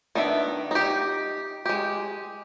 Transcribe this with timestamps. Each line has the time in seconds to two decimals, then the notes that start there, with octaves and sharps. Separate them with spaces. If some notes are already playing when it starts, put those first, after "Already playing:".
0.15 D#3 B3 D4 E5
0.71 D#4 G4
1.66 G#3 G4